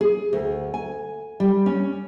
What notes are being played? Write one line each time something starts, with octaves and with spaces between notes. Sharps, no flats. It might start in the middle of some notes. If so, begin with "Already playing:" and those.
G#4
D2
G#5
G3
C#4